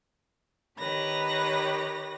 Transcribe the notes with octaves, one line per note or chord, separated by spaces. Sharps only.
D#3 G4 B4 C#5 A#6